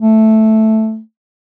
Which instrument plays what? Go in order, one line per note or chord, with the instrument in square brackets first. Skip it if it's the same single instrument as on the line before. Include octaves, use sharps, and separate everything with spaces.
[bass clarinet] A3